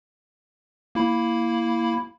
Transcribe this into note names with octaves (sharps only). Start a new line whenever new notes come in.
A#3 E4 B5